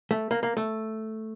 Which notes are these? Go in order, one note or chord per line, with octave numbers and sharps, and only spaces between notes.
A3
A#3
A#3
A3